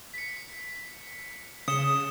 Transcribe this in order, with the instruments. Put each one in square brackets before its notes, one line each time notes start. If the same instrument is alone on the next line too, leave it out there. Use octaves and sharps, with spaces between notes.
[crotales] B6 C#7
[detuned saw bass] C#3 [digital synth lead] D#6 [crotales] C#7 E7 G7